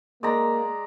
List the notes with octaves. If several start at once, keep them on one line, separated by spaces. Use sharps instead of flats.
G#3 A#3 D5 A#5